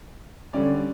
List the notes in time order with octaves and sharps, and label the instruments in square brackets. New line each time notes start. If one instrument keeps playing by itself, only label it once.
[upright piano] D3 G3 C#4 D5